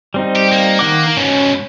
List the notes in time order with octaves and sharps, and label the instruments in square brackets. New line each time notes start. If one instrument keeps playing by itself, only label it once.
[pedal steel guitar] G3 C4 D#4
[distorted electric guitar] G4
A#3
[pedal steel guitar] D#3 F#5 D6
[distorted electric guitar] G#2 B2 [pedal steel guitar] C#4